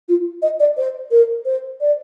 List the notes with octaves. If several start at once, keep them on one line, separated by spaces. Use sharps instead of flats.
F4
D#5
D5
C5
A#4
C5
D5